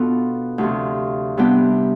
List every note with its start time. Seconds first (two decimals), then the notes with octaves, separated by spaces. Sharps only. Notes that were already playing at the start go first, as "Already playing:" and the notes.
Already playing: B2 B3 D4 F4 A4
0.58 D2 C3 F3
1.37 C3 G3 B3 D4 G4